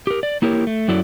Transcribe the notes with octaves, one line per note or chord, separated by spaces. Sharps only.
G4 A#4
D5
A#3 E4 G4 A#4 C#5
A3
F#2 F#3 E4 A4 D5